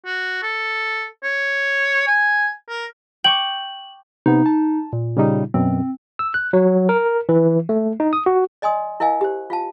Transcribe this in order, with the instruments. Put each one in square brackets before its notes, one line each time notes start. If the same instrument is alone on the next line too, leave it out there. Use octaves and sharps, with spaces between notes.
[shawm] F#4
A4
C#5
G#5
A#4
[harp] G5 C#6 D6 [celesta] F#7
[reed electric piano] C3 B3 [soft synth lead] D#4
[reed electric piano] A5
[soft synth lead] A#2
[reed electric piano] C#3 G3 D#4
[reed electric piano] F#2 B2 [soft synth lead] C4
[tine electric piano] E6
F#6
F#3
A#4
E3
A3
D#4
D#6
F#4
[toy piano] D5 D#5 G#5 C6 D#6
E4 A#4 D#5 F5 G#5
G4 C5
F4 F5 A5